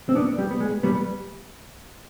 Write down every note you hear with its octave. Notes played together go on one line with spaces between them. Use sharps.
C4
B3 D4
G3
B3
G#3
G3 B3